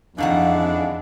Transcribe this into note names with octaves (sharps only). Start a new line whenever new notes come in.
F2 B2 D#3 E3 G#3 D4 F5 F#5